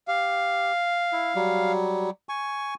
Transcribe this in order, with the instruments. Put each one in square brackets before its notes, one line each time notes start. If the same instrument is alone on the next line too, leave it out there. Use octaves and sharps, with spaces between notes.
[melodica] G4 [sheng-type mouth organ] F5
[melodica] E4
F#3 G3
G#5 C#6